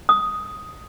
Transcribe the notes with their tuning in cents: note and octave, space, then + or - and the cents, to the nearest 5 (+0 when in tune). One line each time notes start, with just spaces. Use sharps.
D#6 +5